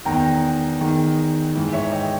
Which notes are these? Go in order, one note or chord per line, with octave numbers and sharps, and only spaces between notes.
E2 D#3 G5 A#5
E2 D#3
G#2 E3
C#5 E5
D#5 G5